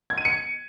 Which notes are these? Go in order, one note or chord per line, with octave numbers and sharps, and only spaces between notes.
G#6
D#7
C#7